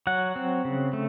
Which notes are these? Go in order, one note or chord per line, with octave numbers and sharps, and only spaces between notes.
F#3 F#5
C4
C#3
A3